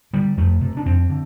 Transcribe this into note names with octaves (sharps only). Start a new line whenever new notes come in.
D3 G3
F2 A3
C3
D4
F2 C4
D3